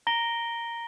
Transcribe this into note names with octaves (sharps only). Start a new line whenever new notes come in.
A#5 A#6 D7 G7